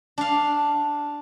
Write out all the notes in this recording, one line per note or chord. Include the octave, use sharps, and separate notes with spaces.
D4 F5